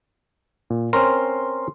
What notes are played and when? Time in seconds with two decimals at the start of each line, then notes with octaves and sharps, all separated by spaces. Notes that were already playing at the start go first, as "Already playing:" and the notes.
0.70 A#2
0.93 C4 C#4 A#4 C6